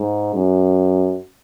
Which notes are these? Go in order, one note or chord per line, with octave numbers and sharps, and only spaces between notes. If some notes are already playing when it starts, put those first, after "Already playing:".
Already playing: G#2
F#2